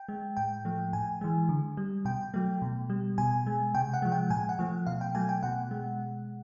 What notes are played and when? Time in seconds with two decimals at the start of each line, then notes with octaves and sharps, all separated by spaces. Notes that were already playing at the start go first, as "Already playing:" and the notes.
Already playing: G5
0.09 G#3
0.37 A2 G5
0.65 F3 A3
0.93 A2 G#5
1.21 E3 G#3
1.49 D3
1.77 G3
2.05 B2 G5
2.34 F#3 A3
2.62 B2
2.90 G3
3.18 B2 G#5
3.47 G#3
3.75 C3 G5
3.94 F#5
4.02 F3 G#3
4.12 G5
4.30 A#2 G#5
4.49 F#5
4.59 F3 A3
4.86 B2 F5
5.01 G5
5.15 F#3 A3 G#5
5.29 G5
5.43 B2 F#5
5.71 G#3